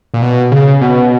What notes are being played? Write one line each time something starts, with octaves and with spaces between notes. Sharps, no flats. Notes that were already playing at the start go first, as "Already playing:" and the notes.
A#2
B2
C#3
B2